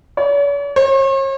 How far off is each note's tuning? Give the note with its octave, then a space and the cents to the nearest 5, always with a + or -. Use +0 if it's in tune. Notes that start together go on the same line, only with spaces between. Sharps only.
C#5 +45
C#5 -45